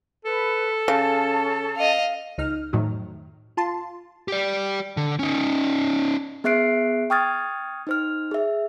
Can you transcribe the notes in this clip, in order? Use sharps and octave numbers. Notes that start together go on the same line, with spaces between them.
A4 B4
C#3 C#4 A5
D#5 F5
C#2 D#4 F6
F2 A2 D#3 F#3
F4 A5 C6
G4 D5
D3
C#4 D#4
B3 G#4 E5 F#6 C7 D7
G5 C#6 D#6 F6 G#6 A6
D#4 C5 F6
G#4 E5